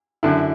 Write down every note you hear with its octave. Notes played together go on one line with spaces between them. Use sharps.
F#2 D3 E4